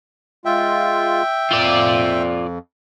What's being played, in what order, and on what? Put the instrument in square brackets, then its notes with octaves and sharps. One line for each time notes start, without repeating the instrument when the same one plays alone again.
[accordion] G#3 F4 [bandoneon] E5 G5
[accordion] F2 [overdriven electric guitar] F4 D5